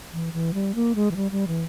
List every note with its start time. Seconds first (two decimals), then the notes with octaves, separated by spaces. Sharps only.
0.13 E3
0.33 E3
0.54 G3
0.75 A#3
0.95 G#3
1.11 E3
1.16 G3
1.31 G3
1.48 E3